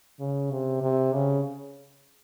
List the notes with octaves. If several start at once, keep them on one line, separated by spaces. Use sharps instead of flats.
C#3
C3
C3
C#3